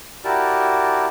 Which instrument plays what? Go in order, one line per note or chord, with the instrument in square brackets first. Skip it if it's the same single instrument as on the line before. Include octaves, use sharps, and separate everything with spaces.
[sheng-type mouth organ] E4 F#4 G4 A#4 D5 A5